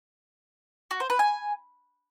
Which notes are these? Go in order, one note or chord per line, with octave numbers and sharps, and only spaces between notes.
F#4
C5
B4
G#5